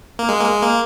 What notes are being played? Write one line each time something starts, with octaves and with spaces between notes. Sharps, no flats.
A#3
G#3
A#3
G#3
A#3